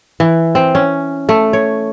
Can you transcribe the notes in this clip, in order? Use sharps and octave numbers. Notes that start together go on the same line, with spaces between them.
E3
C4
C#4
A3
C#5